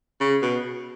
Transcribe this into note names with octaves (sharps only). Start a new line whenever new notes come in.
C#3
B2